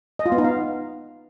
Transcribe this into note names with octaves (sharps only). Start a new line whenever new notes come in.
D#5
F4
B3
D#4
F5